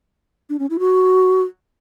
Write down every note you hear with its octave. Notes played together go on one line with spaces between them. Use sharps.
D4
C#4
E4
F#4